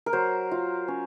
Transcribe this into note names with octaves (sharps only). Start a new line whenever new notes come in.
A#4
F#3 C5
F4
C#4